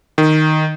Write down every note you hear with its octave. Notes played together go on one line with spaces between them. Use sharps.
D#3